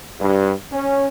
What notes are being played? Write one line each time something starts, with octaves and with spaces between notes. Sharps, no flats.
G2
C#4